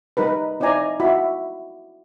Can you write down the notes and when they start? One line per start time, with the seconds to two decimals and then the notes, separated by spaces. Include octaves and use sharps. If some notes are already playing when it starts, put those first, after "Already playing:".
0.17 G3 D#4 A#4 B4
0.60 C4 D#4 E4 D5 G#5 A#5
1.00 E4 F#4 B5